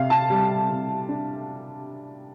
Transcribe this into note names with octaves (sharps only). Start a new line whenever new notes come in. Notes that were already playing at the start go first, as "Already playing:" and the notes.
Already playing: C3 F5
A5
G3
C3
D4